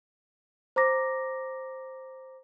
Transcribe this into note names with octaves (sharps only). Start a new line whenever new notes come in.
C5 A#5 D6 A#6